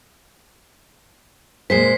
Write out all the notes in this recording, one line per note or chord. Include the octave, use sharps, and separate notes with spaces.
A#2 G#3 C5 B6 C7